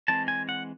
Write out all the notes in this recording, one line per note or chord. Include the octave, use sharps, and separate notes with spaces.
E3 G#3 C4 A5
G#5
F#5